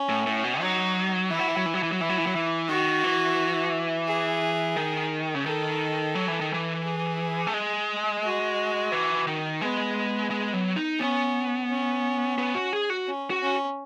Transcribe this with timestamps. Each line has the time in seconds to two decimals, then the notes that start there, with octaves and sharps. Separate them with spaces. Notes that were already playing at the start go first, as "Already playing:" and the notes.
Already playing: C#4
0.09 A2
0.27 A2
0.44 B2
0.61 F#3 D#4
1.30 E3 E4
1.39 F#3
1.48 E3
1.57 F#3
1.66 E3
1.74 F#3
1.83 E3
1.92 F#3
1.99 E3 E4
2.09 F#3
2.18 E3
2.27 F#3
2.35 E3
2.68 D#3 F#4
3.04 E3
4.07 G#4
4.76 D#3
5.35 C#3
5.46 D#3 A4
6.15 F#3
6.28 E3
6.41 D#3
6.54 E3
6.84 G#4
7.47 A3
7.54 G#3
8.23 F#4
8.92 E3
9.27 D#3
9.61 G#3 B3
10.30 G#3
10.53 F#3
10.76 D#4
10.99 B3 C#4
11.69 C#4
12.38 B3
12.55 F#4
12.73 G#4
12.90 F#4
13.07 C#4
13.30 F#4
13.42 C#4